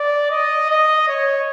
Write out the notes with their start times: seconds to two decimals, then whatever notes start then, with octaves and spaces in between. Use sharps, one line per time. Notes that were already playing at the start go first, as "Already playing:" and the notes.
Already playing: D5
0.31 D#5
0.69 D#5
1.08 C#5